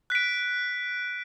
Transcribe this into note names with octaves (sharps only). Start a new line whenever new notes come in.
F#6 B6 D7